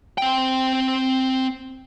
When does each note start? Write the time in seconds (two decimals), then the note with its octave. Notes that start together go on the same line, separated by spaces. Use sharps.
0.18 C4 G5